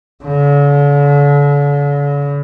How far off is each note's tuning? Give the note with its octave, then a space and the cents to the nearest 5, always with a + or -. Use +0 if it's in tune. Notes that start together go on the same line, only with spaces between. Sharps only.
D3 -45